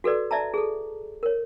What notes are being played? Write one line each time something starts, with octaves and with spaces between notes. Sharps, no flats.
F#4 A4 B4 D5
D5 E5 A5 A#5
G#4 A4
A#4 C#5